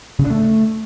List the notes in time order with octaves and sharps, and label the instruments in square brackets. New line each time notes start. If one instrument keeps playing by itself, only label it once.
[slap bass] C#3
D4
A3